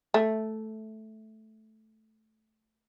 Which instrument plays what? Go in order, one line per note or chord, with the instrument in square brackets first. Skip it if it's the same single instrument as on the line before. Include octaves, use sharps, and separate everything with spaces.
[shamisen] A3